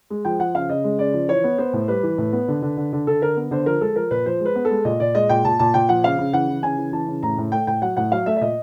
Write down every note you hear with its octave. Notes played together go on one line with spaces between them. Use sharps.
G#3
F3 G5
F3 F#5
C#3 F5
C#3 D#5
G#3
C#3 D5
F3
E3 C#5
B3
B3 C5
A2
G3 B4
E3
A2
B3
D3
D3
D3
D3
D3 A4
D3 A#4
B3
D3 C5
F3 A#4
G#3 A4
F3 A#4
A#2 B4
F3 C5
G#3
B4
B3
A4
G#3
A#2 D#5
A#2 D5
G#3 D#5
A#2 G5
A#2 A5
A#2 A5
A#2 G5
F3 F#5
C#3 F5
C#3
E3 F#5
E3
C#3 G#5
E3
E3 A5
C#3
A2 A#5
A2
A3 G5
A2 G5
F#3 F#5
A2 F#5
F#3 F5
A3 E5
E5
A#2 D#5